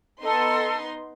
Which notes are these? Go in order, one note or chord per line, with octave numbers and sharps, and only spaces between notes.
B3 D#4 A4 C6